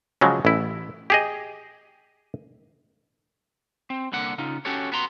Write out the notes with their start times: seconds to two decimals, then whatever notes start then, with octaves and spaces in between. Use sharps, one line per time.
0.21 C#3 F3 F#3 G#3
0.45 A1 E4
1.10 G4 G#4 D#5
3.90 C4
4.12 C2 D3 A#3 F#5
4.38 C#3 D#4 F4
4.65 C#4 F#4 G4 A4 C#5
4.92 B3 F#4 A#5 C6